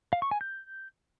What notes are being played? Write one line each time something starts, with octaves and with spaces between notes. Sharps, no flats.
F5
C#6
G#5
G6